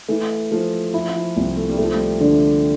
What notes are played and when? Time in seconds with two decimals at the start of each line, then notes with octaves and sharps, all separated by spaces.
0.08 E3 A3
0.51 F3 A3
0.93 F3 E4
1.15 F3
1.35 C2 F3
1.56 A3
1.69 G3
1.78 F3 A3
1.93 G3
2.21 D3